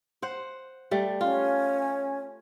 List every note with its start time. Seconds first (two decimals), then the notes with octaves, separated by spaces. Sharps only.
0.22 C5 F#5
0.91 G3 A3
1.21 C#4 F4